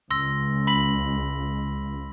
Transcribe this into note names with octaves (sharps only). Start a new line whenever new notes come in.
C#2 C6 E6 A#6
B5 B6 F#7